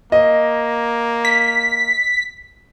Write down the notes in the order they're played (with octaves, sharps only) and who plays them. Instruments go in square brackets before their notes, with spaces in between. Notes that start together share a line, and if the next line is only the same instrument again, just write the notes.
[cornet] A#3 [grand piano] D#5
[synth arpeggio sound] B6